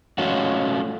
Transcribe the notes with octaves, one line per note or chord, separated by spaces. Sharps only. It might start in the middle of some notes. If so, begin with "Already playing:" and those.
A3 C#4 F4 F#4